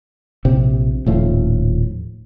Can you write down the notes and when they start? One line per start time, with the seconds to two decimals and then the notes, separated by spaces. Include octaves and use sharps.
0.45 A#1 C3
1.06 D#1 A2 F3